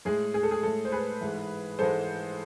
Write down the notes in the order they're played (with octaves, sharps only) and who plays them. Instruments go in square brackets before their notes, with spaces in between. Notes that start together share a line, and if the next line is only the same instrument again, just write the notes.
[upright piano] A2 G#3 G#4
G#4
A4
G#4
A2 G#3 A4
C5
G#4 B4
G#2 E3 G#3
G#2 E3 G#3 A4 C5